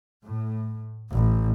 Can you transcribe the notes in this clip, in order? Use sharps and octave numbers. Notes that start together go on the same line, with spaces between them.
A2
A1